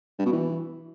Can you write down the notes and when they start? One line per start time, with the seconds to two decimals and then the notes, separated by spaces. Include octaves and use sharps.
0.19 G2
0.26 B2
0.33 E3